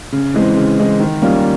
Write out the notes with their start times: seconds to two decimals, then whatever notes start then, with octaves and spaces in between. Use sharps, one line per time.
0.12 C#3
0.34 E3 G#3 C4
0.57 C#3
0.78 E3 G#3 C4
1.00 D#3
1.22 G3 A#3 C#4 F4